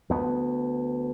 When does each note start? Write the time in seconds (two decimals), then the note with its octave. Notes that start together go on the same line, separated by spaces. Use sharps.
0.10 D2 B3